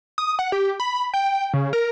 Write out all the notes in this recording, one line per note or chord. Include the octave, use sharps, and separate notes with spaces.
D#6
F#5
G4
B5
G5
C#3
A#4